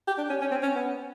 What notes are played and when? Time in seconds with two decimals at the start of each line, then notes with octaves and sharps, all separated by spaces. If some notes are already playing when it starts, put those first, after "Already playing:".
0.07 G4
0.18 D4
0.30 C#4
0.41 C#4
0.51 C4
0.63 C#4
0.75 B3